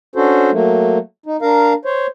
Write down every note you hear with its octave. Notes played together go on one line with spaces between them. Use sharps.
C#4 D4 F#4 A4 C5
F#3 A3 A#3
D#4
D4 A#4 F5 A#5
C5 C#5